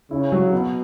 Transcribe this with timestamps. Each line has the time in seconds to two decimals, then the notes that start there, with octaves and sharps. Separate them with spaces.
0.11 C#3 E4
0.32 F#3
0.52 B2 B3